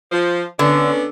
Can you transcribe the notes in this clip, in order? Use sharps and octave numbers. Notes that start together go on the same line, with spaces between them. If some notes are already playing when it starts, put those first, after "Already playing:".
F3
D3 B3 C#4 D4